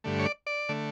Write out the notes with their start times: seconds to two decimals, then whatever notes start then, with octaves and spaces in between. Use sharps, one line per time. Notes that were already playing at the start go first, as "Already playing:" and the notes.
0.04 G2 D3 A3
0.19 C#5
0.26 D5
0.47 D5
0.69 D3 A3